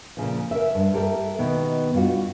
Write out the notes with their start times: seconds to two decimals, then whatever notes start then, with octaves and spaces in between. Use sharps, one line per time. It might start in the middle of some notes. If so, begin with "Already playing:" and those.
0.17 A#2 C#3 F3
0.51 A#4 C#5 E5
0.75 G2
0.94 G4 A4 A#4 C5 E5
1.38 B2 D#3 B3
1.94 G2 F4 F#4